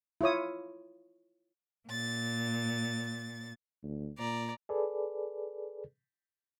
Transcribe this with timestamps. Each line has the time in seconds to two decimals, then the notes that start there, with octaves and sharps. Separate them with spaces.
0.21 E4 F4 C#5 D#6
1.86 A#2 A6
3.83 D2
4.18 A#2 D5 A#5
4.69 G#4 A4 B4 D5